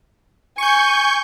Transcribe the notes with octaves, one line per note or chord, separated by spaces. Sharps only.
G#5 C#6 G6